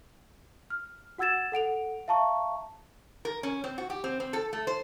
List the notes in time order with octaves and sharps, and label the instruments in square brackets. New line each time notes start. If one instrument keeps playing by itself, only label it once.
[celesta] F6
F#4 F#5 E6 G#6 A6 E7
A4 F#5 D7 F7
E5 F5 A5 A#5 C#6
[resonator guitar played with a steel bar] A#4
C#4
C4
F#4
G4
C4
C4
A4
A3
C5